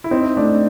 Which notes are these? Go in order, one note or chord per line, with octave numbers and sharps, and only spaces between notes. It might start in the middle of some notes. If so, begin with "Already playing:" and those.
E4
C4 D#4
A3 D4